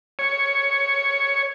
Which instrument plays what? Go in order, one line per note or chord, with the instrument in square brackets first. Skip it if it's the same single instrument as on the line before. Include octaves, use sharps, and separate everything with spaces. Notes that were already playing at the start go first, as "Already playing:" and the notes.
[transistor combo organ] C#5